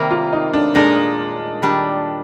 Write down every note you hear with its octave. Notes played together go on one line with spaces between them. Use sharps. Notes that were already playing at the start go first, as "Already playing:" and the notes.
Already playing: C3 D#3 G3 A#3
F4
D#4
D4
A#2 G#3 D4 D#4 A#4 D#5
D#3 G3 D4